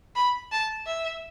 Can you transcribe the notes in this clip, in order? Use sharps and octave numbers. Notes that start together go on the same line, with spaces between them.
B5
A5
E5